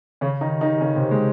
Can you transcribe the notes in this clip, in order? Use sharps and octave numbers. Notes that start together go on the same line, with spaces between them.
C#3 C#4
D#3 D#4
D#3 D#4
C#3 C#4
C3 C4
G#3